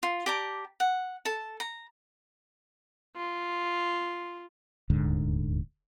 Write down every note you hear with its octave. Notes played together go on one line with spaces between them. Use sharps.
F4
G4 D5 A5 A#5
F#5
A4 A5
A#5
F4
D#1 D2 G#2 D3